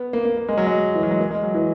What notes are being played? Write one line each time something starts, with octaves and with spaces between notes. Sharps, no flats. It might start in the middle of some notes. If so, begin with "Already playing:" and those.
Already playing: B3
A#3
A#3
A#3
G#3
F#3
G#3
E3
F#3
G#3
A#3
G#3
F#3
E3